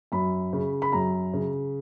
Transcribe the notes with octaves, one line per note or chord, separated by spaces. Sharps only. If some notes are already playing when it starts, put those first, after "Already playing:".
F#2 B5
C#3
B5
F#2 A#5
C#3